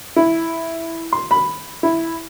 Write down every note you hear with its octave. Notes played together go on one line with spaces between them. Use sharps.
E4
C6
B5
E4